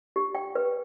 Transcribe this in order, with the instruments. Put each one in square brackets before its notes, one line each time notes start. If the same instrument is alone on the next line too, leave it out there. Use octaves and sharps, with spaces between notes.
[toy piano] G4
G5
B4